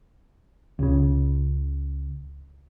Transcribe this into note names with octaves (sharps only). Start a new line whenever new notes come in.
C#2 C#3